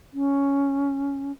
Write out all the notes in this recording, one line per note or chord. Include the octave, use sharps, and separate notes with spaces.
C#4